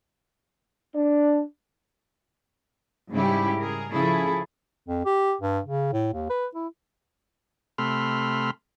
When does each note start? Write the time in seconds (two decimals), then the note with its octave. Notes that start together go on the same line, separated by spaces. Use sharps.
0.95 D4
3.11 G#2 C#3 G3 E4 G4
3.60 G#4 A#4
3.92 C#3 F3 E4 G#4 A4
4.87 F2
5.05 G4
5.41 G2
5.65 C#3
5.93 A2
6.13 D#2
6.30 B4
6.55 E4
7.78 C3 A3 B5 C6 F6